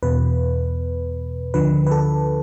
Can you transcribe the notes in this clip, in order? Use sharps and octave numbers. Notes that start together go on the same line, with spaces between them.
E2 B2 B4
D2 D3 F3 B4
B4
A4